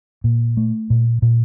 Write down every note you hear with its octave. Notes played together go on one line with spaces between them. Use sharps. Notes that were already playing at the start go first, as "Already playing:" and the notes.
A#2
A3
A#2
A#2